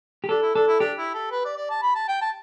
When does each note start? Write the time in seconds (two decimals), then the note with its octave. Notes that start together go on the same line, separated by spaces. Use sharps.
0.24 G4
0.29 D4 A4
0.42 E4
0.55 D4 A4
0.68 E4
0.80 D4 G4
0.98 E4
1.14 A4
1.31 B4
1.45 D5
1.57 D5
1.70 A5
1.83 B5
1.95 A5
2.08 G5
2.22 A5